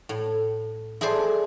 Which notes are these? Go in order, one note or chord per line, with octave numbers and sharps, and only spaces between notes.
A2
E4 G#4 A4 C5 D5